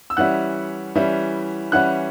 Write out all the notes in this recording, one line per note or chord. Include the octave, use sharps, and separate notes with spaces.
E6
E3 G3 C#4 E4 F#5 F#6
E3 G3 C#4 E4
E3 G3 C#4 E4 F#5 F#6